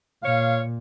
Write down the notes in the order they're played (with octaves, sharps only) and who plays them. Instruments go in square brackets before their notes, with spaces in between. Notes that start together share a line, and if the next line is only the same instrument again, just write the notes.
[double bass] A#2 [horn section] C#5 F5